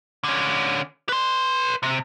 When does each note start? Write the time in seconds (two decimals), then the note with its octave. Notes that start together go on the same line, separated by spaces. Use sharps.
0.24 D3 C#4
1.09 B4 C6
1.83 C3